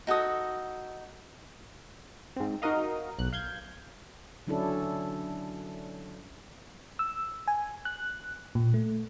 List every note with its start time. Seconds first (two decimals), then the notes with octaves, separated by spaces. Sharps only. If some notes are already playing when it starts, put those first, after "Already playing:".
0.07 D#4 F#4 A4 D#6
2.36 G#2 C4
2.62 D#4 F#4 A#4 D#5 F5
3.19 B1 F#6
3.33 F5 G6 G#6
4.47 D3 F#3 C#4 D4 E4 A4
6.99 E6
7.48 G#5
7.85 F#6
8.55 A#2
8.74 A3